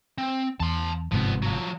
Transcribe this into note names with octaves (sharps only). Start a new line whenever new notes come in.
C4
E2 A5 C6
G1 G#2 C3 F3 B3
F3 F#3